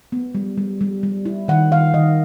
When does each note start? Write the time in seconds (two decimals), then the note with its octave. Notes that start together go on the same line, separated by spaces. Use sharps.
0.12 B3
0.35 G3
0.58 G3
0.81 G3
1.03 G3
1.25 E4
1.48 D#3 F#5
1.72 D#3 F5
1.94 D#3 D#5